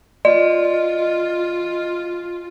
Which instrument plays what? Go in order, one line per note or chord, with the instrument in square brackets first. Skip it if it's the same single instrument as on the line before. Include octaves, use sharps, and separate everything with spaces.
[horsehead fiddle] F4 [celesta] D5 [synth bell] D#5